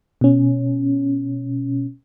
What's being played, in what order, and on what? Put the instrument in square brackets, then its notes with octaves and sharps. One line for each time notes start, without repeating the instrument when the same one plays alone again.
[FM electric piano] B2 C#4